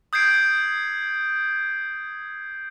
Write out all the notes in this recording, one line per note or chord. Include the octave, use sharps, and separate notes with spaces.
D#6 G6 G#6 C7 D7